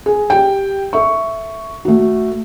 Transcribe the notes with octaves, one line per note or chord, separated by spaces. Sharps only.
G#4
G4 G5
A4 E5 C#6
A3 F#4